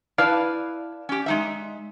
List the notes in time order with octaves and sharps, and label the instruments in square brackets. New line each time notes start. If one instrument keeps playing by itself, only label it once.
[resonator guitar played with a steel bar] E4 B4 A5 [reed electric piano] D5 F5
[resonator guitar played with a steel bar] C#4 G4
G#3 D#4 E5